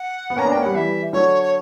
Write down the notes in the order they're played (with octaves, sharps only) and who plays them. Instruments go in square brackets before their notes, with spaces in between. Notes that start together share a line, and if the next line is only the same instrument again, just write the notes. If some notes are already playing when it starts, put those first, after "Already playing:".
Already playing: [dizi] F#5
[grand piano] B3
[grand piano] A#3 C#4 [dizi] A#5
[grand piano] B3 D4
[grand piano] A#3 C#4 [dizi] G5
[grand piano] G3 B3 [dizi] F#5
[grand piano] E3 G3 [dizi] E5
[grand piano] D3 F#3 [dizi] C#5
[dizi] C#5